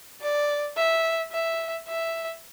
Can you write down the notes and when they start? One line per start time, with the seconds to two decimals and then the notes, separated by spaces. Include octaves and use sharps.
0.22 D5
0.77 E5
1.32 E5
1.88 E5